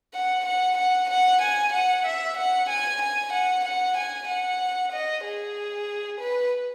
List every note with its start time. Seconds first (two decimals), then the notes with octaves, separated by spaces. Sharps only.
0.14 F#5
0.46 F#5
0.78 F#5
1.10 F#5
1.41 G#5
1.73 F#5
2.06 E5
2.37 F#5
2.69 G#5
3.01 G#5
3.33 F#5
3.65 F#5
3.97 G#5
4.28 F#5
4.92 D#5
5.24 G#4
6.20 B4